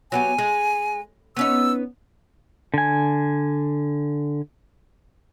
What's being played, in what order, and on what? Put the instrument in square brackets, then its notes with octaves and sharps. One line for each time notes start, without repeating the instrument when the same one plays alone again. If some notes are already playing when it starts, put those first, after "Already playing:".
[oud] F#3 B3 G4 [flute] G#5
[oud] G#3
[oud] B3 C#4 D#4 [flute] E6
[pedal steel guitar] D3 G#5